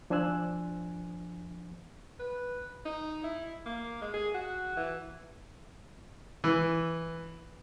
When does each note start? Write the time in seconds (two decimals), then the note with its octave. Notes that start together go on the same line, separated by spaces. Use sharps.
0.10 F3 D4 C5 G#5 E6 F#6
2.20 B4
2.85 D#4
3.24 E4
3.66 A#3
4.02 G#3
4.14 G#4
4.35 F#4
4.77 E3
6.44 E3